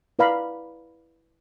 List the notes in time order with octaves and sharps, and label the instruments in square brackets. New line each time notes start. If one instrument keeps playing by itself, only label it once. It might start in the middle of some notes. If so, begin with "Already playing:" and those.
[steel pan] E4 B4 D5 F5 A#5 B5